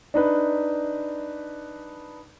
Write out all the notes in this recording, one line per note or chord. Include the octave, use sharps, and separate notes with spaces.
D4 D#4 B4